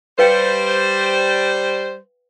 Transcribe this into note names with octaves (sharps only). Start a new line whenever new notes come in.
G3 B4 C5 F5 G5